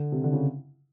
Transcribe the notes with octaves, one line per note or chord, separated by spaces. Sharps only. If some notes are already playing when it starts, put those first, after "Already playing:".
Already playing: D3
C3
D3
C#3